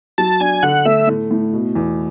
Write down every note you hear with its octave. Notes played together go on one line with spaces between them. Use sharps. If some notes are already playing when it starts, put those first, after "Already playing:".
F#3 A5
D4 G#5
D3 F#5
A3 E5
A2
A2
B2
E2